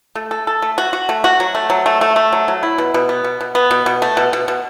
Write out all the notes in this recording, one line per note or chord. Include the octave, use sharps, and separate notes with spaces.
A3
A4
A4
A3
F#4
F#4
A3
F#4
F#3
A3
F#3
A3
A3
A3
F#3
F#3
E4
B2
B2
B3
B2
B2
B3
B2
B2
A3
B2
B2
B2